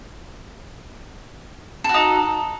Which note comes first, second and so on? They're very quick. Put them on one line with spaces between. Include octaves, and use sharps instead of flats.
A4 F#4 D#4